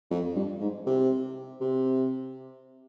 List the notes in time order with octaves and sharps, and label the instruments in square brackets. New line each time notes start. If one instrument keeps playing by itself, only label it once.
[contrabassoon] F2
G2
G#2
C3
C3